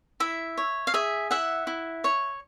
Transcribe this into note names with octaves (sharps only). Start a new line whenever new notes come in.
E4 E5
C#5
F5
G#4 E5
E4 E5 F#5
E4
C#5